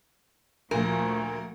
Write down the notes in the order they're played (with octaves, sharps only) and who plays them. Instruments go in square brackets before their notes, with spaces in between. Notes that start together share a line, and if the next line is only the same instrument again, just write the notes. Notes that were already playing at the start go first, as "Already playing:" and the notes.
[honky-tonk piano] D2 A#2 [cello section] F3 A3 F#4 [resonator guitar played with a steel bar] A#4